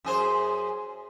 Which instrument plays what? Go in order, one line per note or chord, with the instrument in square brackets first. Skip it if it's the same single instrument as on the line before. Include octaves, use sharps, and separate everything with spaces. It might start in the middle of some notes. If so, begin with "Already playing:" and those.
[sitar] F#2 G#4 C5